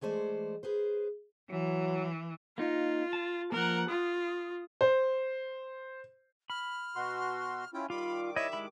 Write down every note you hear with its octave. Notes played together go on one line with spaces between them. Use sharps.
E3 G#3 A3 C5 D5
G#4 B4 C5
E3 F#3
A#3 D#4 F4
A5
F3 A#3 A#4 F#5
F4 D#6
C5
B5 F6
B2 F#4 C6
C#4 E4 F4 G5
D#3 G3 F4 B5 D6
E4 C#5 D#5 E5
G#3 E4 B5